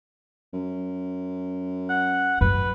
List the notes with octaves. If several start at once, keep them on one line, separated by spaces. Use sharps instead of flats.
F#2
F#5
F#2 B4